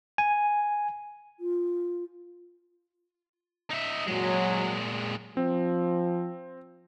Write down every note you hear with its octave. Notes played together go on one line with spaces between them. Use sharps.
G#5
F4
D#4 E5
A#2 F#3 G#3
F3 C4